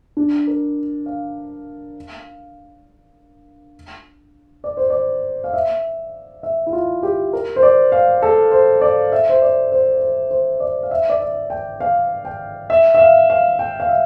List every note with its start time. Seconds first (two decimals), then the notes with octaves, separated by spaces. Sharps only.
0.17 D4
0.47 A#4
1.06 F5
4.64 D5
4.77 C5
4.90 D5
5.44 F5
5.53 E5
6.43 E5
6.66 E4
6.73 F4
7.03 G4
7.33 A#4
7.56 C5
7.63 D5
7.92 F5
8.22 A4
8.51 C5
8.81 D5
9.12 E5
9.29 C5
9.42 D5
9.72 C5
10.01 C5
10.30 C5
10.60 D5
10.83 F5
10.91 E5
11.09 D5
11.20 E5
11.50 G5
11.81 F5
12.25 G5
12.70 E5
12.95 E5
12.99 F5
13.30 F5
13.59 G5
13.80 F5
13.89 E5